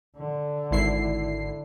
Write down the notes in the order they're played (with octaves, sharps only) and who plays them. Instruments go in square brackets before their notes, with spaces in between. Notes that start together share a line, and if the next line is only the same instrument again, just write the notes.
[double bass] D3
[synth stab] G#1 E4 C7